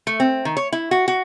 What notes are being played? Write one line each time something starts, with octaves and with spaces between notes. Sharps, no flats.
A3
C4
D#3
C#5
E4
F#4
F#4